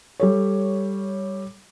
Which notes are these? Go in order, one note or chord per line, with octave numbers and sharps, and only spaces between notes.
G3 A4 C#5